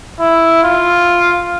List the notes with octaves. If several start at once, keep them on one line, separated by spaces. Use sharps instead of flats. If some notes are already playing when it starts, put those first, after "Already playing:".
E4
F4